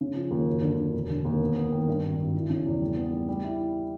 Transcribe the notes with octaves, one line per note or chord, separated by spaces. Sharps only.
C#3
F3
D#2
F#2
D3
D3
E1
D3
D#2
B3
B3
D#3
G2
G#1
G#1
E3
C#3
E2
G3
B3
G3
G3
E4
E4